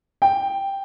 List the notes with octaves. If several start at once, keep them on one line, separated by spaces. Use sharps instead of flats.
G5